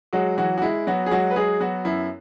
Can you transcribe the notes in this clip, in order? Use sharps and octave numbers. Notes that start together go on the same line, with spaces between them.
F#3 G#3 F#4
E3 F#3 F#4
F#4
G#3 E4
F#3 B3 F#4
G#4
F#3 G#3 F#4
B4
F#3 G#3 G#4
F#3 B3 F#4
F#2 E4